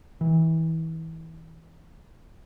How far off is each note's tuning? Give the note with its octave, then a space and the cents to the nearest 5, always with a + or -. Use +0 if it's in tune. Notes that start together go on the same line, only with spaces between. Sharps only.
E3 -30